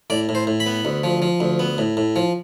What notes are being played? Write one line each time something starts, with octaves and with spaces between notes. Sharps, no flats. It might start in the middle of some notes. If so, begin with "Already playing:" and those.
A2 D5
A2
C5
A2
B5
B3
D2
F3
F3
D2
B3
A2
A2
F3